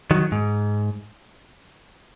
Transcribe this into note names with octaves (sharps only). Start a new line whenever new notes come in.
D#3 F#3
G#2